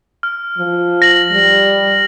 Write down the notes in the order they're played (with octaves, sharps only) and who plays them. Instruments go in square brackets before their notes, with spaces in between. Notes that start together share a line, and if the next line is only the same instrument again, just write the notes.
[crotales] F6
[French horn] F3
[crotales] A#6 F#7
[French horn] G3